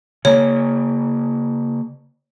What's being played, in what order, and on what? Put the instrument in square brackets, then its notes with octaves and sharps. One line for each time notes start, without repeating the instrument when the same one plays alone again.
[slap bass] C#3 A#3 [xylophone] C#5